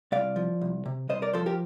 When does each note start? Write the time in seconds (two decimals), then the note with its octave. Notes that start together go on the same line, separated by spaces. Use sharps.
0.12 C2 D5 F5
0.36 F3
0.61 C2
0.86 C3
1.09 C2 C5 D#5
1.22 A#4 D5
1.33 F3 A4 C5
1.46 G4 A#4